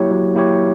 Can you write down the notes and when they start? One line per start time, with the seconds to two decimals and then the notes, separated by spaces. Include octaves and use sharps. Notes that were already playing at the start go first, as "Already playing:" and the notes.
Already playing: F#3 A#3 E4 G4 C#5
0.11 F#3
0.35 A#3 E4 G4 C#5